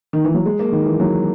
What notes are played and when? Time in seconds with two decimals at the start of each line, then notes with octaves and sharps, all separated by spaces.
0.13 D#3
0.25 E3
0.34 F#3
0.46 G#3
0.59 A#3
0.72 D#3
0.86 E3
1.00 F#3